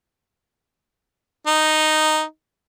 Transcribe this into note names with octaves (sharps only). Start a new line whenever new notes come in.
D#4